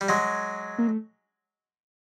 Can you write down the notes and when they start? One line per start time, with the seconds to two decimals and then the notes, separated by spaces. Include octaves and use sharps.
0.01 G3
0.09 F#3 G#3
0.78 A#3
0.87 A3